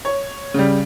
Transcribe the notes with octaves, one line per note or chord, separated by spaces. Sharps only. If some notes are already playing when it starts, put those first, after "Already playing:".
C#5
C#3 G3